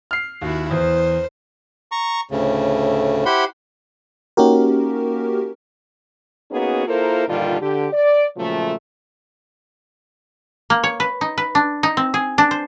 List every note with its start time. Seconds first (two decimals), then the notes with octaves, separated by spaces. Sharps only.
0.11 F6 C7
0.42 D#2 E4 F#4
0.71 E2 C5
1.92 A#5 C#6
2.31 D2 A2 C#3
3.26 E4 G4 C5 F#5 B5 C6
4.37 A#3 C#4 D#4 F#4 G4 A#4
6.51 A#3 B3 C#4 D#4 F#4 G#4
6.87 A#3 E4 F4 A4 A#4 C5
7.28 G2 A#2 D3 D#3 G3 F4
7.61 D3 G4
7.93 D5
8.37 A#2 C#3 F3 F#3 A3
10.70 A#3
10.84 C#5
11.00 B4
11.21 D#4
11.38 B4
11.55 D4
11.83 D#4
11.97 C4
12.14 G#4
12.38 D4
12.51 C5